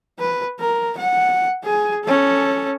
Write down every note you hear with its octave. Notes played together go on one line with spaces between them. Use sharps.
B4
A#4
F#5
G#4 G#5
C#4 A4